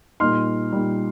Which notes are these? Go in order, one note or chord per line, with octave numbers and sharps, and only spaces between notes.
A#2 G3 D#4 C6 F6
A#2 G3 D#4